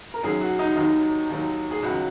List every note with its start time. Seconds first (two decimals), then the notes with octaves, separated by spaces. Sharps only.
0.14 A#4
0.23 F#2 D#3 F#3 G#4
0.42 F#4
0.59 D#4
0.76 D#2 D#3 F#3 D#4
1.30 D#2 D#3 F#3
1.71 G#4
1.83 C#2 C#3 F#3 F#4